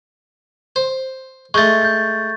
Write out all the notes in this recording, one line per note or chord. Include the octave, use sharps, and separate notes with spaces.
C5
G#3 A3 C#6 G6 A6
G6 A6